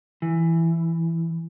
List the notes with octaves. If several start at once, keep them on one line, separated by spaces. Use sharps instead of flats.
E3